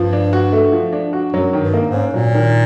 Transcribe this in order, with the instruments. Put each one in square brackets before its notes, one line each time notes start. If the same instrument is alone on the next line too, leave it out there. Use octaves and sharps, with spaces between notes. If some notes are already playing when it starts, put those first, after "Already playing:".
Already playing: [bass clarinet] G2 [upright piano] F3
[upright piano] D4
F#4
A3
F3
D4
F#4
[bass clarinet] F#2 [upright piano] F#3
[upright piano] D#3
[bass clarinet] G2
[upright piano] A#3
[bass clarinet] G#2
[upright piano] C#4
[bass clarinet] A#2 [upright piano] F#3
[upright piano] D#3